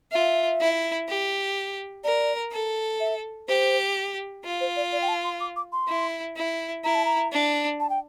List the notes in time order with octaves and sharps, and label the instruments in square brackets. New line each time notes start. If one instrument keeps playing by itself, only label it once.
[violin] F4 [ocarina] E5
[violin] E4
G4
[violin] A#4 [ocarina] D5
[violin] A4
[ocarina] E5
[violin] G4 [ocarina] C5
[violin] F4
[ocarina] C5
D5
D5
G5
A5
C6
D6
D6
C6
[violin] E4
E4
[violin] E4 [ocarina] A#5
[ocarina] A5
A#5
[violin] D4
[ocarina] A5
G5